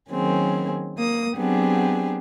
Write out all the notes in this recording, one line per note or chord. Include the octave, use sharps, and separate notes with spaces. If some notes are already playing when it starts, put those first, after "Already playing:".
D#3 F#3 A#3 C4 C#4 G#4
A#3 D#6
F#3 B3 C4 D4 G4 G#4